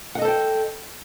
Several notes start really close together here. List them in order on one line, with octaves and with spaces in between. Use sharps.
F#5 D#5 A4 C5 G5